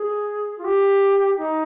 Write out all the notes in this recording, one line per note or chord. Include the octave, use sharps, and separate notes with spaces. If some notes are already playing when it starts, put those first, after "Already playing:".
Already playing: G#4
F4
G4
D#4